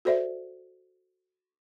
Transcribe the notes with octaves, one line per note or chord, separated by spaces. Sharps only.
F#4 A4 C5 D5 E5